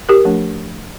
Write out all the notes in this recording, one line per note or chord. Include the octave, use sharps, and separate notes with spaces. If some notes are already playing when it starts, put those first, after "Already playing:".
G4 A#4
F3 A3 D4